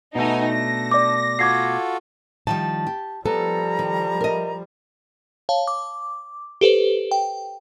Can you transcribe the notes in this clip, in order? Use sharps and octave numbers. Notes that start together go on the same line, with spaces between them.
B2 A3 B3 D#4 G#5
D4 A#6
D5 D6
F4 F#4 A4 D6 G#6 C7
D#3 F3 G3 A5
G4
F3 G3 B3 A4 A#5
D#3
A#4 D#5
C#5 F5 A5
D6
G4 A4 B4 C5
G5